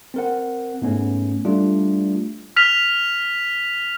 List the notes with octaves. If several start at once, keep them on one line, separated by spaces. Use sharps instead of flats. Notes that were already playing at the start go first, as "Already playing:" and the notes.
C4 A#4 F#5
G#2 A3 B3 C#4
G3 A3 D4 F4
F6 B6 F7